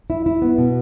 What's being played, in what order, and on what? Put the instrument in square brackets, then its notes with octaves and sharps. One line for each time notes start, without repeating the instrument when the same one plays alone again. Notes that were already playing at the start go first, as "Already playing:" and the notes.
[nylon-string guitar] E4
E4
B3
B2